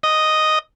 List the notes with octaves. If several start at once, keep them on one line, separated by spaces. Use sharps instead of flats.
D#5